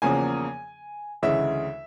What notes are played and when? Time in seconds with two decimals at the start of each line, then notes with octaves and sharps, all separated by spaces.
0.02 E2 C#3 F3 A#3 G#5
1.23 D2 C#3 E3 G#3 E5